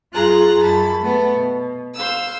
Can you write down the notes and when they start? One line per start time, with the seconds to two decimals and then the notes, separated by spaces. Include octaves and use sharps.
0.14 F#2 F4 G#4 A#5 F#6
0.61 F#2 A5 B5
1.01 A3 B3
1.33 B2
1.94 C5 F5 E6